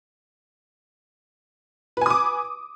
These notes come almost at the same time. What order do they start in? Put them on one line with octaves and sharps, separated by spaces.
B4 G#5 D#6 D6